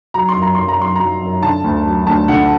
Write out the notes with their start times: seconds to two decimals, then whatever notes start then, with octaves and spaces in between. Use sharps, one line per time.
0.14 F#3 A#5
0.29 C6
0.36 F#2
0.42 A#5
0.55 F#2 C6
0.68 A#5
0.79 F#3 C6
0.95 F#3 A#5
1.21 F#2
1.43 D3 A5
1.64 D2
1.85 F#3
2.07 D2 A5
2.28 D3 F#5